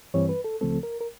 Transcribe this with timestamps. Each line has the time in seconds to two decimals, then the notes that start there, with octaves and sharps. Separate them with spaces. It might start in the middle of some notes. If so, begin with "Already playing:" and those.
0.14 G2 E3 G3 C4 C#5
0.29 B4
0.44 A4
0.61 C#2 C#3 F3 A3 C4 A4
0.83 A#4
1.01 A#4